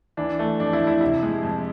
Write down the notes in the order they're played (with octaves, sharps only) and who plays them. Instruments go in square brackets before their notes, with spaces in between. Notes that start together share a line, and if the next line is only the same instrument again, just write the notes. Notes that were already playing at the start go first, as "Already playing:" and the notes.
[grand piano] E3 D4
A3
F2 D4
E4
F2
E4
C3 E4
G#3
F2